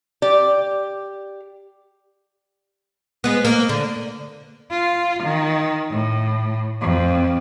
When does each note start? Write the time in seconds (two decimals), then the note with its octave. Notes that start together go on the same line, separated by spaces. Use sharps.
0.22 G4 D5
3.24 G#3 B3
3.45 A#3
3.69 D3
4.72 F4
5.22 D#3
5.91 A2
6.82 F2